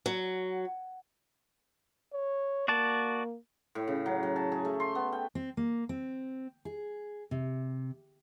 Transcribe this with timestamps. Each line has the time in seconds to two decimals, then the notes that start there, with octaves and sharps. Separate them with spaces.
0.06 F#3
2.13 C#5
2.68 A#3 F#4 D5 A5
3.75 A2
3.87 C#3
4.06 F#3
4.23 F#3
4.36 A5
4.52 G#4
4.65 A3
4.80 C6
4.95 B3
5.12 G5
5.35 C4
5.57 A#3
5.89 C4
6.65 G#4
7.31 C3